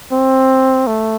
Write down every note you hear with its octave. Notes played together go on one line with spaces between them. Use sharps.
C4
A3